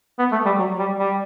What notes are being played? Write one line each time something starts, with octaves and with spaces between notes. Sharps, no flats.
B3
A3
G3
F#3
G3
G3